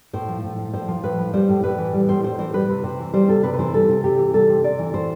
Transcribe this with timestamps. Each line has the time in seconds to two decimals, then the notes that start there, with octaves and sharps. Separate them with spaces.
0.13 A2 C5
0.28 F3
0.43 A2
0.58 F3
0.73 A2 C5
0.88 F3
1.03 A2 B4
1.18 F3
1.34 G3 C5
1.49 A2
1.63 A2 B4
1.78 E3
1.93 G3
2.09 A2 C5
2.23 A2 C5
2.38 E3 C5
2.53 G3 B4
2.69 C3
2.84 C3 C5
2.99 E3
3.14 G3 C5
3.29 C3 A4
3.43 C3 B4
3.54 B4
3.59 E3 C5
3.74 G3 A4
3.89 C3
4.04 C3 G4
4.18 E3
4.34 G3 A4
4.49 C3
4.64 C3 D5
4.79 E3
4.94 A2 C5